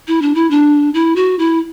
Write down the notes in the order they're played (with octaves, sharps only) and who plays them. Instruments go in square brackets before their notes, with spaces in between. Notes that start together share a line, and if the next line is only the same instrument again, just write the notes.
[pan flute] E4
D4
E4
D4
E4
F#4
E4